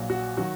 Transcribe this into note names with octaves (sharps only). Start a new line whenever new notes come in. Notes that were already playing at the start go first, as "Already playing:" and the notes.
Already playing: A#1 A#2 F#3
F#4
D#3 F#3 F#4